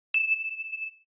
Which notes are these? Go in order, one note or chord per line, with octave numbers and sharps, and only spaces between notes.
E7